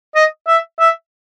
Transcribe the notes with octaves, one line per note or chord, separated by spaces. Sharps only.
D#5
E5
E5